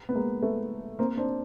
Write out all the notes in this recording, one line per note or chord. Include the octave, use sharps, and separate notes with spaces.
B3
G#3 A#3
A3 B3
A#3 C4
C4 D4